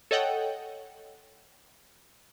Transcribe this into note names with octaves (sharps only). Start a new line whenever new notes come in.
A4 C#5 D#5 F#5 G5